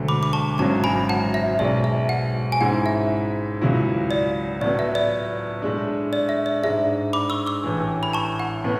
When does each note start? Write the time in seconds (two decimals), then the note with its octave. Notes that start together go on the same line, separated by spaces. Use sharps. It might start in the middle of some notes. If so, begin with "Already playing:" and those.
Already playing: E1 D2 D3 F#3 A3
0.08 B5 D6
0.23 D6
0.33 A5 C#6
0.58 G#1 F#2 C#3 F#3 A5 C#6
0.84 G#5 B5
1.09 F#5 A5
1.34 E5
1.59 B1 B2 G#3 D5
1.84 E5
2.09 F#5
2.52 G#5
2.61 G#2 G#3 C#4 E4 F#5
2.86 E5
3.61 C#2 C#3 F#3 C#4 E4
4.11 D5
4.61 A2 F#3 B3 D5
4.79 E5
4.95 D5
5.62 A2 G#3 D4
6.13 D5
6.29 E5
6.46 D5
6.63 G#2 G#3 D4 E5
7.13 B5 D6
7.30 C#6 E6
7.47 C#6 E6
7.64 A1 A2 E3
8.03 B5
8.13 A5 C#6
8.40 F#5
8.64 A2 B3